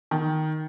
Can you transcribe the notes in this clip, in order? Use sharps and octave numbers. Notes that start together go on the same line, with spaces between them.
D#3